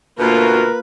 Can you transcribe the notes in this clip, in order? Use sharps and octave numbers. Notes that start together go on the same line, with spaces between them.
D2 B2 A#3 F4 A#4 B4